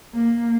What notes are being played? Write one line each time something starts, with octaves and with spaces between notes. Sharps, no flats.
A#3